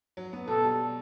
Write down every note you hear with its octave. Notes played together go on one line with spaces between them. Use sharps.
F#3
B3
B2 A4
G3